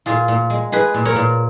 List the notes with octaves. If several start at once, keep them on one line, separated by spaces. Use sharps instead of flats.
A#2 F4 G#4
A#2
G#3
G#3 G#4 B4
A#2
A#4 C#5
A#2